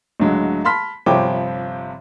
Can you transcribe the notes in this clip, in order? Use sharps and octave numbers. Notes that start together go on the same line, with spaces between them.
C#2 A2 D3 F#3 G#3
A5 B5 C6 F6 B6
G1 C3 F3 C#5 G5 D6